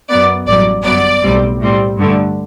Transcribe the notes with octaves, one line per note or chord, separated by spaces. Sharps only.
F#2 F#3 B3 D5
A1 G2 F#3 D5
G1 F#2 F#3 B3 D5
B1 A2 G3 C4
A2 G3 C4
G2 D3 A3